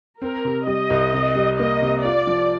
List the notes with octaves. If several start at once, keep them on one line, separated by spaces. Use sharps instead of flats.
C4 A#4
C3
G3 D#5
C2
C3
G3
A#3 D#5
C3
F4 D5
F3